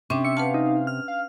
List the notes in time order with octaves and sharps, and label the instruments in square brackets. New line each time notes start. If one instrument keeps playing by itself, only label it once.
[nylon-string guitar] C3 [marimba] C#4 D4
[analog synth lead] E5 [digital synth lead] C#7
[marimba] B4 F#5 A5 [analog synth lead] F5
[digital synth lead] D#4
F6
[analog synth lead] F5